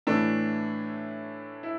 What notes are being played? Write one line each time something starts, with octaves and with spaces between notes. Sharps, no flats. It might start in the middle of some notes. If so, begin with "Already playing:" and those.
A2 E3 A3 D4
E4